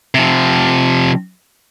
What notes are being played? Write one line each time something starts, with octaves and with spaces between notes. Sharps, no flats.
C3 F3